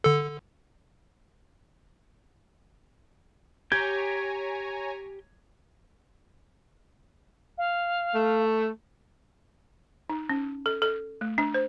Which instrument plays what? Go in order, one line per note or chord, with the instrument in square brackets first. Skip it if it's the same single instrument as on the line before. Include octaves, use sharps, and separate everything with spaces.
[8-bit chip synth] D3 A4
[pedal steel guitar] G4 G6 [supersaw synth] C#5 G#5 A#5 [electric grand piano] G#6
[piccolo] F5
[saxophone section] A3
[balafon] D#4
C#4
A4
A4
A3
D4
C5